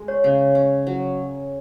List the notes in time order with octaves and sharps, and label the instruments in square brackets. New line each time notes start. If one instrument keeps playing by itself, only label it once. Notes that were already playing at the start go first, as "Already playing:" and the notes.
Already playing: [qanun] G#3
[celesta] C#5
[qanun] C#3
C#4
F#3